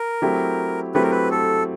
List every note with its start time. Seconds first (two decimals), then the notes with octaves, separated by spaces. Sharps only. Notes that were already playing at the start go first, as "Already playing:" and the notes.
Already playing: A#4
0.22 F#3 A3 C4 E4 G4
0.94 F#3 A3 C4 E4 G4 B4
1.03 A#4
1.11 B4
1.31 A4